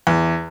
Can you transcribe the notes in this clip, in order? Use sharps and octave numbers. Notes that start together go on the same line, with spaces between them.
E2